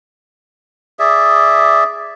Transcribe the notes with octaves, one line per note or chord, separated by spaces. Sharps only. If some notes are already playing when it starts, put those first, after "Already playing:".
G#4 D5 E5